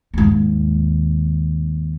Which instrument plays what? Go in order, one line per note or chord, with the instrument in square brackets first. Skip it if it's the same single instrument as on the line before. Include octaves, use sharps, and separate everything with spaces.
[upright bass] D#2 G#2